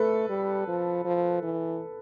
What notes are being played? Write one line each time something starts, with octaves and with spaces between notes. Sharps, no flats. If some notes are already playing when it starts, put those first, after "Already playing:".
Already playing: A3 A4 B4
G3
F3
F3
E3